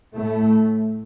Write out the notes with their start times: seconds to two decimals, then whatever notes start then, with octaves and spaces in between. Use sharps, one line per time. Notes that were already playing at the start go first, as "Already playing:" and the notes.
0.15 A2 A3